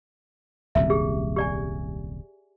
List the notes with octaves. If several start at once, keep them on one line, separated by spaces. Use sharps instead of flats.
D#1 C2 F#2 E5
G4 G#4
G4 D5 G#5